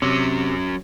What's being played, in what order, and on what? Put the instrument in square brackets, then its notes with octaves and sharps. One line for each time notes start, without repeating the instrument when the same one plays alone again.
[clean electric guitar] C3 [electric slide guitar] F#3 C#4